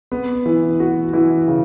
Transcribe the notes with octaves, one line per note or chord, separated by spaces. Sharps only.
B3
E3
F#4
E3
C#3